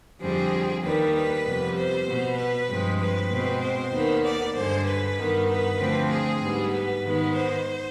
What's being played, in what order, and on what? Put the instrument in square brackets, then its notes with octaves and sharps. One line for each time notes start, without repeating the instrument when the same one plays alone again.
[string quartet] F2 D3 G3 C4 G#4
D#2 D#3 G3 B4
B4
F2 C3 G3 B3
C5
B2 B3
B4
G2 F3 G#3 C4
B4
B2 G#3 C4
C5
D#2 D#3 B3
D5
G2 D3 G#3 C5
B4
G2 D#3 B3
B4
D2 D3 F3 C4
G#4
G#2 G3 B3
B4
G#2 D#3 G#3 B3
C5